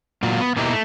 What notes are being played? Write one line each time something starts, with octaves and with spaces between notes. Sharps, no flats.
A#2 F#3 F4
B3
B2 A#3 D#4 E4 G4
A3